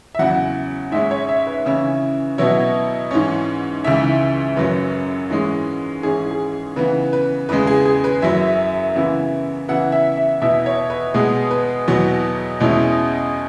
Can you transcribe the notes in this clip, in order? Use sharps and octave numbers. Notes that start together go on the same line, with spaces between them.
E5
E2 C#3 F#3 F#5
G#2 G#3 C#4 E5
C#5
E5
B4
C#3 E3 C#4 E4
B2 F#3 B3 E4 C#5
G#2 E3 C#4
C#2 C#3 E3 E5
F#2 C#3 F#3 C#4 B4
G#2 E3 G#3 C#4
G#2 E3 C#4 G#4
G#4
C#3 E3 B3 B4
B4
E2 C#3 G#3 B4
G#4
G#4
B4
F#2 F#3 E4 E5
C#3 E3 B3 E4
C#3 E3 B3 E4 F#5
E5
E5
E2 B2 B3 E4 E5
C#5
B4
B2 G#3 B3 G#4
B4
E2 B2 F#3 B3
E2 B2 G#3 C#4 E4